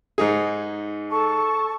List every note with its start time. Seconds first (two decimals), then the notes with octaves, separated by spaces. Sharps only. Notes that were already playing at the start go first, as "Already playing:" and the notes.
0.18 G#2 D#4 G#4
1.10 A4 A5 C#6